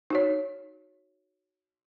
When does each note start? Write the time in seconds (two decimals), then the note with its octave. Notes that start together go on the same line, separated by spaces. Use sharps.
0.10 D#4 F#4 C#5